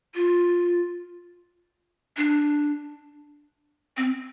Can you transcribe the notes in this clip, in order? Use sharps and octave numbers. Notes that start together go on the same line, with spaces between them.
F4
D4
C4